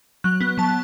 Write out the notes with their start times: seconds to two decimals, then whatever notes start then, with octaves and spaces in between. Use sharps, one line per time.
0.24 F#3 F#6
0.41 B3
0.58 F#3 A5